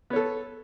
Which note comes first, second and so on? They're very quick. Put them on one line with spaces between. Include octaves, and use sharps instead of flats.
B3 C#5 A4